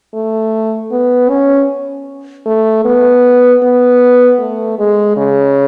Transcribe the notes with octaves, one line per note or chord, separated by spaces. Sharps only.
A3
B3
C#4
A3
B3
B3
A3
G#3
C#3